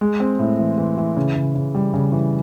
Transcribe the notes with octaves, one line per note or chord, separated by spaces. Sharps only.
G#3
C4
A2
E3
E3
E3
C#3
C#3
C#3
G3
C#3
E3